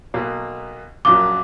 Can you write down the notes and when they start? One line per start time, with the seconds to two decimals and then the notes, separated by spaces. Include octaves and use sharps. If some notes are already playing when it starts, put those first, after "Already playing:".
0.14 B1 B2 A#3
1.05 A#1 F#2 F#3 D6